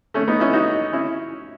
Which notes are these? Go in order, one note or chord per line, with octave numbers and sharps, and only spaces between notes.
A3 C#4
B3 D#4
C#4 E4
D#4 F#4
C#4 E4